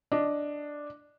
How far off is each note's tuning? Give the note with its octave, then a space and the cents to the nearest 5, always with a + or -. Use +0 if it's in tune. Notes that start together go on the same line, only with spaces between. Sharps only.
D4 +0 D#5 +0